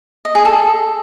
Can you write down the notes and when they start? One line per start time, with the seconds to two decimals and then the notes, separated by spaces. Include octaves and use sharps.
0.25 D#5
0.35 G#4
0.45 A4